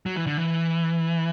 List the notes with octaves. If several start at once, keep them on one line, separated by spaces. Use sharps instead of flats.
F#3
E3
D3
E3